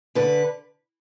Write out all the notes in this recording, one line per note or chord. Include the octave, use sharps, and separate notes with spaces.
D3 B4